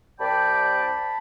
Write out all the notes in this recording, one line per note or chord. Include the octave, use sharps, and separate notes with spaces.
C2 D5 G5 A5 B5